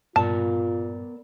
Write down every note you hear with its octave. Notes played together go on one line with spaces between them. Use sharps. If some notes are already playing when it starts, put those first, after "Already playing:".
G2 A#2 B3 F4 A#4 D5 A5